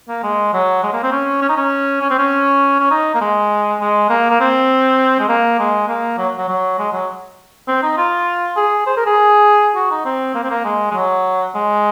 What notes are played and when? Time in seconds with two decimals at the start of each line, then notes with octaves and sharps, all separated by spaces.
0.08 A#3
0.23 G#3
0.53 F#3
0.83 G#3
0.93 A#3
1.03 C4
1.12 C#4
1.42 C#4
1.49 D#4
1.57 C#4
2.01 C#4
2.10 C4
2.19 C#4
2.80 C#4
2.91 D#4
3.15 A#3
3.21 G#3
3.80 G#3
4.10 A#3
4.30 A#3
4.40 C4
5.19 G#3
5.29 A#3
5.59 G#3
5.88 A#3
6.18 F#3
6.38 F#3
6.48 F#3
6.78 G#3
6.93 F#3
7.68 C4
7.83 D#4
7.98 F4
8.56 G#4
8.87 C5
8.97 A#4
9.06 G#4
9.76 F#4
9.91 D#4
10.05 C4
10.35 A#3
10.43 C4
10.50 A#3
10.65 G#3
10.91 G#3
10.94 F#3
11.55 G#3